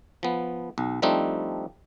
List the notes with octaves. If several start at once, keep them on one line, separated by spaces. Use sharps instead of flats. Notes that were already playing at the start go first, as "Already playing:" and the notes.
F3 B3
B1
F3 G3 A3 C4 D4 D#4